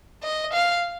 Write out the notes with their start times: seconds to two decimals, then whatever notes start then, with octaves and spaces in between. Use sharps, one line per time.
0.23 D#5
0.53 F5